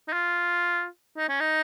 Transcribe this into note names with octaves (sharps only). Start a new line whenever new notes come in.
D#4
F4
D#4
C#4
D#4